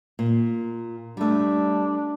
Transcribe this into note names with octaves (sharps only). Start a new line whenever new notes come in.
A#2
G3 A3 D4